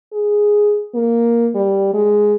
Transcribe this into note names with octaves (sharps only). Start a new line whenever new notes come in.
G#4
A#3
G3
G#3